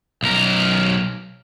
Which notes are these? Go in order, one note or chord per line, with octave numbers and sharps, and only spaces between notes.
B1 A#4